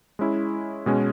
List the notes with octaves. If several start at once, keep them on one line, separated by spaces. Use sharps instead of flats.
G#3 C#4 E4
B2 G#3 C#4